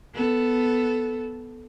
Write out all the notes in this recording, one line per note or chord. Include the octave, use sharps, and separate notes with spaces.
B3 A4